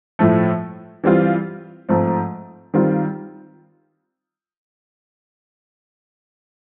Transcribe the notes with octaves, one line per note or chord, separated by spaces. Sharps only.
A2 F3 A3
E3 G3 C4 F4
G#2 F3 A3 C4
D#3 G3 C4 F4